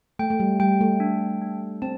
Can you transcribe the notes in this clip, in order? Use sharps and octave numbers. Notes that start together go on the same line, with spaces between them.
A3 G5
A3
G3
G3 G5
A3
D4
D4
C4 A5